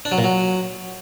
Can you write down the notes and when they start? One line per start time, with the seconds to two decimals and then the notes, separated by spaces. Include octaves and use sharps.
0.05 D4
0.12 F#3
0.18 A#2
0.24 F#3